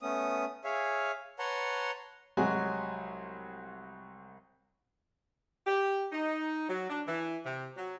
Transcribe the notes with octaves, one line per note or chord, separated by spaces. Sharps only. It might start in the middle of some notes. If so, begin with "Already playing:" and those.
A3 B3 C#4 D#6
G#4 C#5 E5 F5
B4 C#5 F#5 A5 A#5 C6
C2 F#3 G#3 F#4 G#5
G4
D#4
F#3
D4
E3
C3
F#3